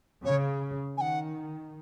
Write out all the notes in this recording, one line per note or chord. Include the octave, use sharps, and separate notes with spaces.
C#3 C#5
D#3 F#5 G#5